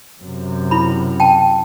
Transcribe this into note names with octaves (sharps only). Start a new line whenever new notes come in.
F#2 C3
E4 B5
G5 A5